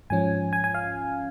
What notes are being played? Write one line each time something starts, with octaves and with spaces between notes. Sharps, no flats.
G#2 F3 C#4 G#5
G#5
G#5
F5